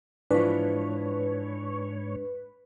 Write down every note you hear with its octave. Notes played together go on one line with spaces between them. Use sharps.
G#2 E3 F3 D4 B4 C#5